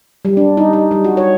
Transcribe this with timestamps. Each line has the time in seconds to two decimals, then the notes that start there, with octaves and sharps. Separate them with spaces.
0.25 G3
0.37 D4
0.57 D#4
0.73 D#4
0.91 G3
1.04 F#4
1.17 C#5